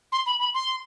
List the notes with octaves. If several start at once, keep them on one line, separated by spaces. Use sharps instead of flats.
C6
B5
B5
C6